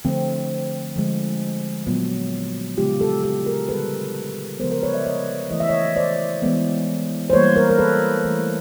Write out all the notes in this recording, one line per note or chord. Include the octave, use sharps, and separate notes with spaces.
D3 F3 A3 C4
D3 F3 G#3
A#2 F#3 B3
C#3 F3 G#3 B3 F4 G4
G4 A4
G4 A4
G#4 A#4
D3 G3 B3 A4 B4
C#3 F3 G#3 B3 A#4 C5
A#4 C5
B4 C#5
D5 E5
C#5 D#5
E3 A3 D#5
E5
C#5 D#5
C5 D5
E3 G#3 B3
C5
E3 G3 A#3 B4 C#5
A#4 C5
A#4
A4 B4
E3 A3